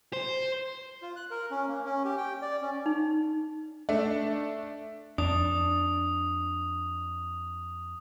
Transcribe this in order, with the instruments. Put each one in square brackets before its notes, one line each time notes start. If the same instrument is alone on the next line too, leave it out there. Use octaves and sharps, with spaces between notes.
[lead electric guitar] C5
[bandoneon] F4
F#6
A#4
C#4
A#3
C#4
G4
G5
D5
C#4
[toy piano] D#4
[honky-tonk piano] A3 D4
[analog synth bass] F2 [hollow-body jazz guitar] D4 [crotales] D#6